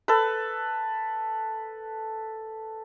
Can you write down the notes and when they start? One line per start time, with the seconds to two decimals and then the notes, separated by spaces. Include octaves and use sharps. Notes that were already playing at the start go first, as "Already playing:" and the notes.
0.08 A4 B4